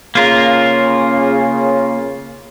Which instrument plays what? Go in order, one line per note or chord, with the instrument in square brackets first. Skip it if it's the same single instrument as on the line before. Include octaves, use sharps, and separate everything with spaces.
[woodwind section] C#3 [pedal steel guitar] A#3 F4 A#4